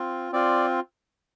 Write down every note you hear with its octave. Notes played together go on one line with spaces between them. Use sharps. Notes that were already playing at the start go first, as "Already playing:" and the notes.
Already playing: C4 F4
C4 F4 D5